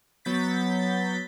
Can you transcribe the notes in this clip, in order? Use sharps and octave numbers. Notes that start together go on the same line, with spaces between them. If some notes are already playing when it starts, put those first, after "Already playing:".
F#3 B3 G6 A6 B6